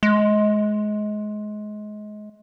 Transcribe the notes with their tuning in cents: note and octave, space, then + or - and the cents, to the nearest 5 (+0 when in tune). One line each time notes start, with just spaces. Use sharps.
G#3 +25